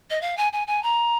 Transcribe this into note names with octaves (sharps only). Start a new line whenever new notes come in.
D#5
F5
G#5
G#5
G#5
A#5